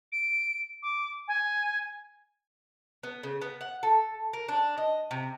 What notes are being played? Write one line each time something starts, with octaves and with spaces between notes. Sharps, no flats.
D7
D6
G#5
B3
C#3
B3
F#5
A4
A#4
D4
D#5
C3